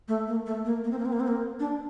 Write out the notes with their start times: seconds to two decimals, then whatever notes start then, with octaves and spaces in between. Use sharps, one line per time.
0.08 A3
0.27 A#3
0.46 A3
0.65 A#3
0.84 A#3
0.91 C4
0.99 A#3
1.05 C4
1.12 A#3
1.20 C4
1.27 A#3
1.60 D4